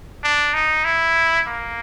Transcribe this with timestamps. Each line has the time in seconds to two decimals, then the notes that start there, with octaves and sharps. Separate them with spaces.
0.24 D4
0.54 D#4
0.85 E4
1.47 A#3